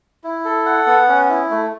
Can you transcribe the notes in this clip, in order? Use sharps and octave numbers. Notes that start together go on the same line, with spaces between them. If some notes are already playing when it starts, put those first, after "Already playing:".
E4
A4
F#5
B3
C#4
E4
A3